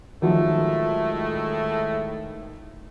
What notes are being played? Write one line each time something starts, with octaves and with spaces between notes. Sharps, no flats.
A2 D#3 F3 F#3 G#3 A3